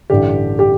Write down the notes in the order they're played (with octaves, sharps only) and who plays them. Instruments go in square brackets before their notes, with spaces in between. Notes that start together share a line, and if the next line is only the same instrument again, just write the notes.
[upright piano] A1 G2 D3 G4
G4